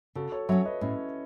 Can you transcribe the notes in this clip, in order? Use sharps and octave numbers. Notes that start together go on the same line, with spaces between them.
C#3 F#4 A4
A4 C#5
F#3 C#4 C#5 E5
B4 D#5
A2 C#4 E4